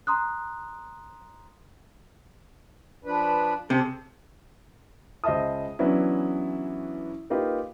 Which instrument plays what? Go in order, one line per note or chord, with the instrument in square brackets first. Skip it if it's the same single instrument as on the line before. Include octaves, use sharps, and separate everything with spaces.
[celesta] A#5 C6 D#6 F#6
[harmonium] F3 D4 B4
[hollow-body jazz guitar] C3 [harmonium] G#4 A4
[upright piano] C#2 C5 D#5 E5 A5 D#6
E3 F#3 B3 C#4 D4 E4
A#3 D#4 F4 G4 B4